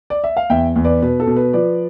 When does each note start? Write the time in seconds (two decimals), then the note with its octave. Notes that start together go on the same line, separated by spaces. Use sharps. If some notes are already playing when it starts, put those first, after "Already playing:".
0.10 D5
0.24 E5
0.37 F5
0.50 E2 E5 G5
0.76 E2
0.84 B4 D5
1.02 B2 B4
1.20 A4
1.27 B2
1.36 B4
1.53 F3 B4 D5